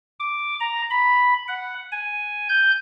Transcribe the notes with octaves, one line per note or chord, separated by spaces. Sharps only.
D6
A#5
B5
F#5
G#5
G6